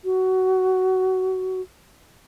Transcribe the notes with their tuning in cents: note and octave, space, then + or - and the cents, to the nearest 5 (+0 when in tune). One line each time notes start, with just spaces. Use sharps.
F#4 +20